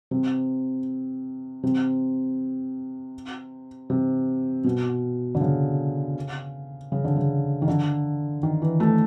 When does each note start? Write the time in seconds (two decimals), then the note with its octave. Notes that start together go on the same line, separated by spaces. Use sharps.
0.11 C3
1.63 C3
3.90 C3
4.64 B2
5.35 D3
5.41 C#3
6.92 C#3
7.05 D3
7.16 C#3
7.62 D#3
7.68 D3
8.43 D#3
8.62 E3
8.80 A3